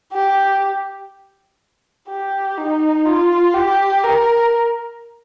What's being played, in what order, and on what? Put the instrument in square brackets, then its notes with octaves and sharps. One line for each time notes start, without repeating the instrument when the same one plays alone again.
[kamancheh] G4
G4
D#4
F4
G4
A#4